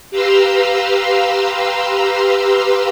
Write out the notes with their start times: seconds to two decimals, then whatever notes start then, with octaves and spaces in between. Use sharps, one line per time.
0.11 G4 B4 F5 A#5 C6 E6